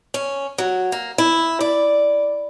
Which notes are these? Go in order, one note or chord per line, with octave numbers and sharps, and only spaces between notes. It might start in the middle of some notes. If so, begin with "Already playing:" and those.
C#4
F#3
A#3
E4
D5